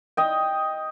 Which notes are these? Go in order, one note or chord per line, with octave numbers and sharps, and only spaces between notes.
D#5 G5